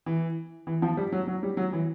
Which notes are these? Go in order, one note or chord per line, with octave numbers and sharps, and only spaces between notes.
E3
E3
F3
G3
F#3
F#3
G3
F#3
E3